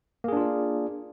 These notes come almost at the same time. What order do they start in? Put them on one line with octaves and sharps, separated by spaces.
A#3 G#4 D4 F4 D5